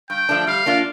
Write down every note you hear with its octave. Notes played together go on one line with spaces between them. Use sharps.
G2 G5
F3 A3 D4
G3 F5
A#3 D4 F4